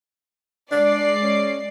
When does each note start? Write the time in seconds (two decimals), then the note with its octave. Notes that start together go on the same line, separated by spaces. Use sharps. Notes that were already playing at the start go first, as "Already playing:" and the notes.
0.72 G#3 D4 D5 C7
1.23 C#4